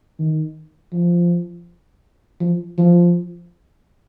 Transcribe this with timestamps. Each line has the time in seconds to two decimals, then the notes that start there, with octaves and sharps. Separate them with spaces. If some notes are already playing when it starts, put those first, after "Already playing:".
0.19 D#3
0.93 F3
2.40 F3
2.78 F3